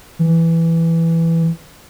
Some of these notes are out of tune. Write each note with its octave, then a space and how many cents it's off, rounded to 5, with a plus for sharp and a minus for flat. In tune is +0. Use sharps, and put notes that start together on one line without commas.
E3 +5